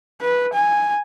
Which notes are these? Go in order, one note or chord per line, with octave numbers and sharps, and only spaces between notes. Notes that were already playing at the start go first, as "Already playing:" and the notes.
B4
G#5